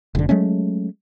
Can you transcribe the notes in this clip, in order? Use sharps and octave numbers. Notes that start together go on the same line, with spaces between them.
F1 D3
F#3 G#3 A3 C#4